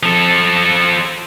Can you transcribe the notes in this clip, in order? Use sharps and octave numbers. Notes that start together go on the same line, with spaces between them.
F3 A4